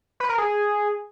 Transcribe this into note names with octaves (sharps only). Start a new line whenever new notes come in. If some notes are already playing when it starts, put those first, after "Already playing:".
B4
A#4
G#4